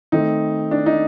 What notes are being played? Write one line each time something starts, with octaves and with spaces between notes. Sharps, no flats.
D#3 A3 C4 D#4
D4
D#4